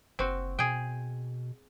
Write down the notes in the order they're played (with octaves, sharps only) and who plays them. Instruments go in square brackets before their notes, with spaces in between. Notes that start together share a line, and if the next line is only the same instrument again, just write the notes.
[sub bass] F#1 [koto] C4 F#4
[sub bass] B2 [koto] G#4 G5